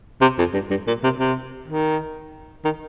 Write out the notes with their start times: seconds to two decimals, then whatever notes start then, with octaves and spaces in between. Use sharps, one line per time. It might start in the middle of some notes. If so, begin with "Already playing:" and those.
0.21 C3
0.39 F2
0.54 G2
0.70 G2
0.87 A#2
1.03 C3
1.19 C3
1.68 D#3
2.65 D#3